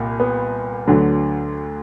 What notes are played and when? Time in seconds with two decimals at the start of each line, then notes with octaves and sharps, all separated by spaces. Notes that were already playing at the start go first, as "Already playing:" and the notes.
Already playing: C2 A#2
0.20 B3
0.88 D2 D3 F#3